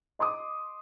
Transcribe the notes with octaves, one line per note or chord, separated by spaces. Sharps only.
D#5 C6 D6 D#6